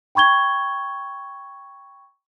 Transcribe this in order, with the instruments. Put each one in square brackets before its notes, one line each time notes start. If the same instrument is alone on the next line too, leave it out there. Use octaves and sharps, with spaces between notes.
[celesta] G5 B5 C#6 G#6 G7